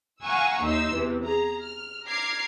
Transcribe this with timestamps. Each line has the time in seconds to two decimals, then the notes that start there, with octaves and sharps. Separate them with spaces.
0.23 F5 F#5 G#5 A#5 C#6 E6
0.63 D#2 D#4 E5 C6 E6
0.94 E2 C3 E3
1.24 G#4 A#5
1.59 F6
2.07 A#5 D6 F6 G#6 C7